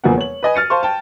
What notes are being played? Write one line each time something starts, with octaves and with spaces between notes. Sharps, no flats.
E1 E2 F3 A#3 F#5
C#5 F#7
B4 D#5 G#5
F6 A6 C#7 D#7
C5 F5 A5 C6 C#6
G5 A5